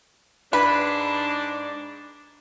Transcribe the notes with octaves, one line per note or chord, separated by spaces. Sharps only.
G#2 D4 B4